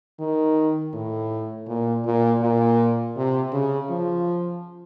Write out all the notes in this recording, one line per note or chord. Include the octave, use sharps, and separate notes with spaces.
D#3
A2
A#2
A#2
A#2
C3
C#3
F3